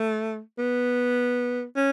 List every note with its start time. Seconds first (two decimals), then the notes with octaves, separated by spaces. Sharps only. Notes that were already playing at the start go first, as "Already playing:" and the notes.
Already playing: A3
0.59 B3
1.76 C#4